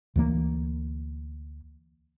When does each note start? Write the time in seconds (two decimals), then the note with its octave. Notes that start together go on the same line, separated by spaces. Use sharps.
0.16 D2 E3 A#3